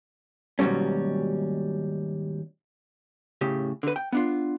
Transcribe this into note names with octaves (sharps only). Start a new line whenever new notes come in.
D#2 G#2 B2 F#3 G3 C#4
A2 C#3 G4
D3 B4
G5
B3 D4 F4